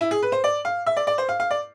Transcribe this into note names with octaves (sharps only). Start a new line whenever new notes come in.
E4
G#4
B4
C5
D5
F5
E5
D5
D5
C5
F5
F5
D5